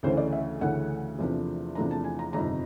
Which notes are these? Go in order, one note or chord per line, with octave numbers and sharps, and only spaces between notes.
D2 C#3 E3 A3 C#4 C5
D5
E5
D2 C#3 E3 A3 C#4 F#5
E2 C3 F3 A3 D4
E2 C3 F3 A3 D4 A#5
A5
G#5
A#5
G1 F2 C3 D#3 A#5